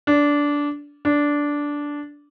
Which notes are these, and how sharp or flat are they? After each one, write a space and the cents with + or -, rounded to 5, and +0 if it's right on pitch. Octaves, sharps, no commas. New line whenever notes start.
D4 -15
D4 -10